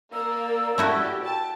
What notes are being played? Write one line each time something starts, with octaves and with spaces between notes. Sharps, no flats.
A#3 D5 E6
A3 E4 F#4 G4
G5 A5